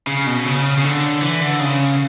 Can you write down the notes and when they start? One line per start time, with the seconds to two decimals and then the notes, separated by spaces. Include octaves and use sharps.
0.07 C#3
0.27 B2
0.45 C#3
0.78 C#3
0.84 D3
1.22 E3
1.41 D3
1.60 C#3